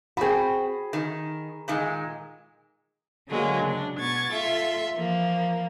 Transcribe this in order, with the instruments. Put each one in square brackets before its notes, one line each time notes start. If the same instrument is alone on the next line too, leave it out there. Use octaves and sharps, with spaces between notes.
[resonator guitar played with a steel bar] C4 F#4 [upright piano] G#4 B5
[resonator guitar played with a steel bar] D#3
A#2 D#3 G#3
[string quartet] D3 F#3 G#3 A#3
C#3 D4
B2 B3 C#6 G#6 A6
F4 A4 E5 C6
E3 F3 A#3